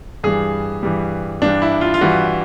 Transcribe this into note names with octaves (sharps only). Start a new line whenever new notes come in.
G2 E3 G3 G#4
G2 E3 G3
G2 E3 G3 D4
E4
F4
F4
G2 E3 G3 F#4